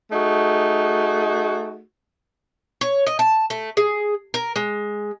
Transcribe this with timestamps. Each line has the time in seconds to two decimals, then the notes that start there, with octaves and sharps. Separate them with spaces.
0.12 A3 D#4 F#4 G#4
2.81 C#5
3.06 D#5
3.19 A5
3.50 A3
3.77 G#4
4.34 A#4
4.56 G#3